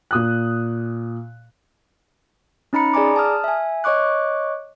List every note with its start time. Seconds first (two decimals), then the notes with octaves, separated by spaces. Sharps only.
0.11 A#2 D#6 F#6
2.73 C#4 D#4 A#5 B5 C#7
2.94 G#4 D5 G#5 A#5 D6
3.16 A5 D#6 F6
3.44 E5 G#5
3.84 C#5 D#5 C#6 D6 F#6